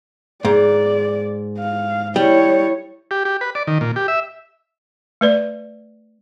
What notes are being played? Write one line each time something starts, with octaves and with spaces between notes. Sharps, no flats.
G#2 D5
F5
G3 E4 C#5
G4
G4
B4
D5
D#3
A#2
G4
E5
A3 B4 D5